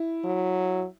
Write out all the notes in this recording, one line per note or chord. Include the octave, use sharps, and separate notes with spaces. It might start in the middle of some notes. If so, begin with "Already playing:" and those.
Already playing: E4
F#3